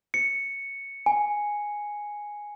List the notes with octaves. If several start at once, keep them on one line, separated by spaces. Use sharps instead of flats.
C#7
G#5